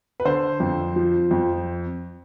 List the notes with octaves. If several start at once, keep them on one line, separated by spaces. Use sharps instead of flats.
B4
D3 C5
F2
F3
F2